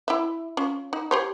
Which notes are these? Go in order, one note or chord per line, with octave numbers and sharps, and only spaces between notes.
E4 E5
C#4 F4
D#4
G4 C5 C#5